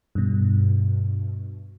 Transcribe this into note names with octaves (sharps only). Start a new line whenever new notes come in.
G2 B2